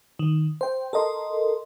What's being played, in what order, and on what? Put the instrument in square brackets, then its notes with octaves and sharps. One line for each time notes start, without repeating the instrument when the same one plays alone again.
[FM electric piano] D#3
C5 G5
A4 A#4 D#5 C6